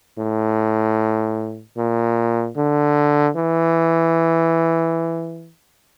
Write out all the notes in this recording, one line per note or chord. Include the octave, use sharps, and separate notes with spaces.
A2
A#2
D3
E3